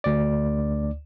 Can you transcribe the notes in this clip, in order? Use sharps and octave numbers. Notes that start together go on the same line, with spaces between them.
D2 D5